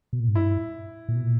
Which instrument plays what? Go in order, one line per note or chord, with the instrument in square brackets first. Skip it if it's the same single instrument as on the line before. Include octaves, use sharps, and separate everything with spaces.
[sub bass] B2
A#2
G#2
[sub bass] G2 [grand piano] E4
[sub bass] A#2
B2
A#2